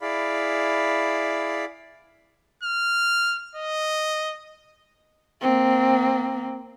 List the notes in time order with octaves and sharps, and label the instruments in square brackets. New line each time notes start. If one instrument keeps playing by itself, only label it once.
[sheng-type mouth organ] E4 G#4 D5 F5 B5
[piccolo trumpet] F6
D#5
[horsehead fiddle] A#3 C4